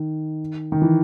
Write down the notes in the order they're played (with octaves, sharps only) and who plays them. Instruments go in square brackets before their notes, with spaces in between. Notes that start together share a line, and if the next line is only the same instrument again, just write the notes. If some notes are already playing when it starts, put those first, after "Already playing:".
Already playing: [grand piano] D#3
D#3
E3